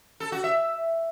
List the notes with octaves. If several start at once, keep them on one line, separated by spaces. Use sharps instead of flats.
A4
F#4
E5